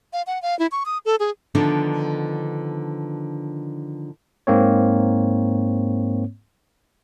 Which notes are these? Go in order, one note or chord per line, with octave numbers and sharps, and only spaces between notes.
F5
F#5
F5
E4
C#6
D#6
A4
G#4
D3 D#3 F3 B3 D4 D#4
G#2 A#3 C4 C#5